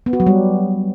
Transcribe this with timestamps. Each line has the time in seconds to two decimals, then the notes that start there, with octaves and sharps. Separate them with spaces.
0.06 B3
0.13 F#4
0.20 F#3
0.27 G3